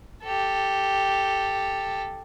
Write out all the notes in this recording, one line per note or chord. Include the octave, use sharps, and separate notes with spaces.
G4 A4